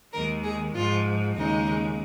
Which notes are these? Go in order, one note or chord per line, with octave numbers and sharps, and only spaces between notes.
D#2 D#3 G#3 A#4
G#4
G#2 F3 G#3 F4
D#2 C#3 G#3 D#4